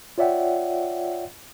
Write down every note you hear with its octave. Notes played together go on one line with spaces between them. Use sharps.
F4 C#5 D5 E5 F#5 G5